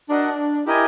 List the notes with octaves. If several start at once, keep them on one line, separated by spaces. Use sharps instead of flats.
D4 F#4 A#4 D#5 F#5
E4 G4 A#4 D#5 G#5